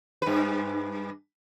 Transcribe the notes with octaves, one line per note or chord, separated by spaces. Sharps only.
G2 B4